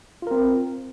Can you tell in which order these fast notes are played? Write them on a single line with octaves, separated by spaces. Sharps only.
F4 A#4 C4